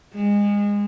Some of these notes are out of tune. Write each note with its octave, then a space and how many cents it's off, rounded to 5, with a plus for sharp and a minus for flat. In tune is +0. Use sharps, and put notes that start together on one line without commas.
G#3 -25